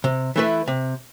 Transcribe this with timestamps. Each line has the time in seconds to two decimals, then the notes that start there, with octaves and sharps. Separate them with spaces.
0.04 C3
0.36 E3 A3 E4 B4
0.68 C3